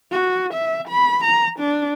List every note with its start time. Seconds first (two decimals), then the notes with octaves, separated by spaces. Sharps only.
0.12 F#4
0.54 E5
0.88 B5
1.24 A#5
1.59 D4